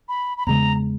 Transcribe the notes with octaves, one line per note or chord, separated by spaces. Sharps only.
B5
B5
E2 C#3 G#3 A#5